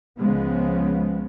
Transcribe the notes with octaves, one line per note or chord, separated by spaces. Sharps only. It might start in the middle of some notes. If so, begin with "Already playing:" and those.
C#2 C#3 F3 G#3 B3